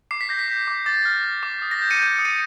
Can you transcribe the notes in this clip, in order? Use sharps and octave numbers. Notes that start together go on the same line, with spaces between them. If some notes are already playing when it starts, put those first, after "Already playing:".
D6 C7
B6
G6 A#6
B6
G6
D6
D6 A6
F6
F6
D6
D#6
A#6
G6
C#7 D#7
G6
D#6
C#7 D#7